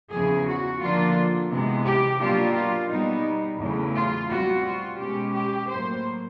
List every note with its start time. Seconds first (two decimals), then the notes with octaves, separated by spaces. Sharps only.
0.11 E2 C#3 F3 G#4
0.47 F#4
0.81 D3 F3 A#3 D4 F4
1.51 C3 E3 G#3 B3
1.85 G4
2.20 B2 F#3 A#3 D4 F4 G4
2.55 F4
2.90 B2 G3 B3 D#4
3.59 E2 C#3 F#3 A3
3.95 F4
4.29 B2 G3 C4 F4 F#4
4.64 F4
4.98 B2 G#3 C#4 G4
5.33 G4
5.68 A2 F#3 A#3 C5